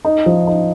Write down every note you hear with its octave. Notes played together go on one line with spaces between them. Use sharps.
D#4
F3
D#4